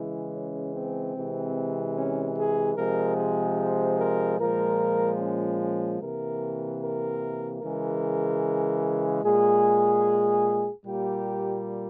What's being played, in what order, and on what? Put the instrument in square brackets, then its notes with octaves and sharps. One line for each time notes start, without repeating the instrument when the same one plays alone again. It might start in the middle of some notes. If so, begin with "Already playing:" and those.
Already playing: [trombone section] C#3 E3 G#3 E4
C#4
C4
C3 E3 G#3
C#4
G#4
C3 F3 G#3 A#4
G#4
C5
A#4
A#2 F3 G#3 A#4
C#4
C#4
C3 E3 A#3 A#4
A#4
C#3 E3 G#3 A#4
A#2 G#3 G#4
A#2 G3 A#3 G4